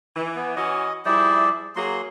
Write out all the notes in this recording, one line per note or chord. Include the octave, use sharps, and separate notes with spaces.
E3
B3
E3 C#4 F#4 D#5
F3 G3 E4 G#4 D5
F#3 A#3 F#4 G#4 C6